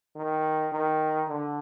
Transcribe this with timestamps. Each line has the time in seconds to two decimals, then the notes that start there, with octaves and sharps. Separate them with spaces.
0.16 D#3
0.72 D#3
1.28 D3